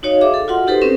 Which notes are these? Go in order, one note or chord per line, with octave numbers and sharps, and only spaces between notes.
D#4 F#4 C#5 D#5 F5
G#4 E5 F5 D6
A4
F4 F#4 D#5 F#5 C6
D#4 G4 A4 B4 C5
C4 C#4 A4 A#4 C5